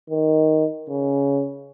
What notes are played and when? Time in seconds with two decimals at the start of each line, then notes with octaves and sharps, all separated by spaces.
0.10 D#3
0.88 C#3